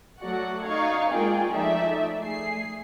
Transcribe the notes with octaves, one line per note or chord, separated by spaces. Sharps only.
F#3 A3 F#4 D5 F#5
D#4 D5 F5 C#6 G#6
G#3 A#3 F4 G#4 D5 G5
F3 A3 D#4 D5 E5
A3 G#4 C7